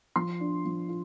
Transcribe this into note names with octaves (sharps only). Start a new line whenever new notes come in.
F3 C6
D4
F3
F4